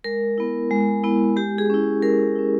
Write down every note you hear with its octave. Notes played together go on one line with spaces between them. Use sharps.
G#3 A#4
B3 E4
G#3
B3 E4
G#3 G4
G#4
C#4 E4
G#3 A#4
C#4 E4